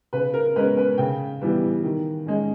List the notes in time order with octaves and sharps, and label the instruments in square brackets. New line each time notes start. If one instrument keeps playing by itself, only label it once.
[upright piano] C#3 B4
A#4
G#3 B4
C#4
B4
C#3 G5
E3 G3 B3
D#3
G#3 C#4